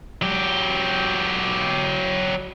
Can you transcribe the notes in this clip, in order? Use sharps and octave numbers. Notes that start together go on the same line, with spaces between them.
F#3 G4